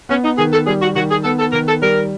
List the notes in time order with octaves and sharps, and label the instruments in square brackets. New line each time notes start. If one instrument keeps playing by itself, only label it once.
[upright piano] B3 [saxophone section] C#4
[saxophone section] D#4
[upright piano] D#3 [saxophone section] G#4
[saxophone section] A4
[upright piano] G3 [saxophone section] G#4
[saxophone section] F#4
[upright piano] D#3 [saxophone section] F#4
[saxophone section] G#4
[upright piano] B3 [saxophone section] A4
[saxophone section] A4
[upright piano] D#3 [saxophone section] A#4
[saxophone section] A4
[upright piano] G3 [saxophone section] A#4